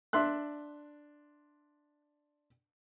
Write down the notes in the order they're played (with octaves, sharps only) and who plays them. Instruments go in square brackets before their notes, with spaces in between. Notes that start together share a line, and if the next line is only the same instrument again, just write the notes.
[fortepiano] D4 E5 C6 F#6